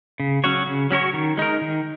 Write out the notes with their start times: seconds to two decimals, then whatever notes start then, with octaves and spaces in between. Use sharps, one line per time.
0.20 C#3
0.44 F#3 C#4 F#4 C#5
0.67 C#3
0.91 F#3 C#4 F#4 C#5
1.14 D#3
1.37 G#3 D#4 A#4
1.61 D#3